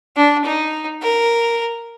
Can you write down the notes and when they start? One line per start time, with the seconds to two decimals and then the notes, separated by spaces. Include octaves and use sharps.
0.17 D4
0.45 D#4
1.02 A#4